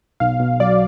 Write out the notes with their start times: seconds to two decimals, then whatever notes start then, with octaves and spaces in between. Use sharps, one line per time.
0.20 B1 F5
0.40 B1
0.60 F#3 D5